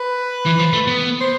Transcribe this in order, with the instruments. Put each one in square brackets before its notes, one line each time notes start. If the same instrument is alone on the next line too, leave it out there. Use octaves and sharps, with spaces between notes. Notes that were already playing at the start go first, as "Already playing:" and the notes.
Already playing: [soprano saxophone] B4
[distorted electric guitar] E3
F3
A3
B3
[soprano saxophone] C5